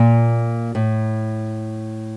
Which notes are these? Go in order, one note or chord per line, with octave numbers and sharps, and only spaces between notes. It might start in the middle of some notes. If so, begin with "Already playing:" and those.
Already playing: A#2
A2